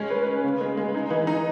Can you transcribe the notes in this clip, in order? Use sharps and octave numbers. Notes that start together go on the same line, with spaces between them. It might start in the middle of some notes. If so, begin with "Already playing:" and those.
Already playing: G#3 C#4
B4
B4
C#3
G#3
G#3
D#4
E3
D#4